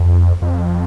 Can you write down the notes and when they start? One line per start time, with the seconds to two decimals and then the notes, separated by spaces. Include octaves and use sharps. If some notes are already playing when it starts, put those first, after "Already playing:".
Already playing: F2
0.42 F2